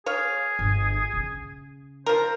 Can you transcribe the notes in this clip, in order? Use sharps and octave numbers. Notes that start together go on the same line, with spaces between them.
G#4 C#5 F5
G1
C#3
F3 A#4 C5